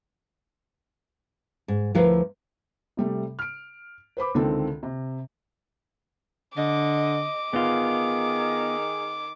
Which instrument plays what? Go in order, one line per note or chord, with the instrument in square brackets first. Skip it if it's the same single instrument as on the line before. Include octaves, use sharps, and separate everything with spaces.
[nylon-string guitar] G#2
D2 F3 E4 A#4 B4 F5
[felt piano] C3 G3 A3
F6 D7
B4 C5 B5 D6
C#2 D3 D#3 C4 A4
C3
[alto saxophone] D3 [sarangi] D#5 [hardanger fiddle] D6
[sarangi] D#3 [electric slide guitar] B3 F4 [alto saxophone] G#4